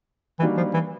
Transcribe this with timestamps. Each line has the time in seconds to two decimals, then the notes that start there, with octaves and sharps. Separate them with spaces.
0.40 D#3 E3 G3 A#3 D4 F#4
0.57 F3
0.74 E3